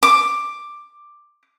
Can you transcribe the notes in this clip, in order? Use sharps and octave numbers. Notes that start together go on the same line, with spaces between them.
D6